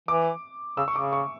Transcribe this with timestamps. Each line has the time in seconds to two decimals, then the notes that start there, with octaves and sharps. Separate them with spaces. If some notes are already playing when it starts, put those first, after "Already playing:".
0.08 E3 D6
0.77 C#3 E6
0.88 C#6
0.96 C#3 D6
1.13 C#6